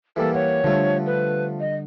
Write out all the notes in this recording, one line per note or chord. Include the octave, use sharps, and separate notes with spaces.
E3 G3 A#3 A4
C#5 F#5
D3 F3 G3 A3
B4
D#5